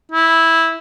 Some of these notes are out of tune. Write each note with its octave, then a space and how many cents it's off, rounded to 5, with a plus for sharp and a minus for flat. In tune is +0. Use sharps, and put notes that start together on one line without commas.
E4 -10